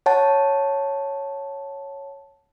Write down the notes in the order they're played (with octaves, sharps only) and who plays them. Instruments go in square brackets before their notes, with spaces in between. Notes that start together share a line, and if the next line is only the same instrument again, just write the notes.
[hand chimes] C#5 F#5 A5